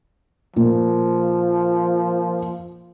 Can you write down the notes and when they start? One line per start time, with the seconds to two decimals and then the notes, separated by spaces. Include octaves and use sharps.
0.56 A#2 F3